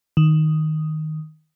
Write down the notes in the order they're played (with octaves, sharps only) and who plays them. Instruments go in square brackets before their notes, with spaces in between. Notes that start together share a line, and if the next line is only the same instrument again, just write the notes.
[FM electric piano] D#3